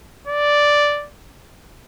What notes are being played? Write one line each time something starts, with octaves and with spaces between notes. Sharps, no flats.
D5